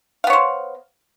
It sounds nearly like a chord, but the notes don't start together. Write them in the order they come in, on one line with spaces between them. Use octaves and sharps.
F5 B3 C#5 C5